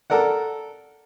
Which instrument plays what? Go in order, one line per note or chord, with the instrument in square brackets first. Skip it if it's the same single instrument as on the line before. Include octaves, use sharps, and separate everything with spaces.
[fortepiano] A4 A#4 D5 F#5